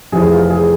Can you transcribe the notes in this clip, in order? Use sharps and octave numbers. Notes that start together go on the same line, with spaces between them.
F1 F2 E3 G#4
F4
G#4